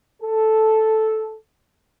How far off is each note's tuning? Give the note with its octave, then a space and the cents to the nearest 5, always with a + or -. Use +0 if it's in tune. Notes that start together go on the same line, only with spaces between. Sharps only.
A4 -5